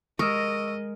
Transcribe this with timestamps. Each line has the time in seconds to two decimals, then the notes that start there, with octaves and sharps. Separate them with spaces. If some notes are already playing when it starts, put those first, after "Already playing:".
0.19 G#3 A#4 D#5 C#6 D#6 E6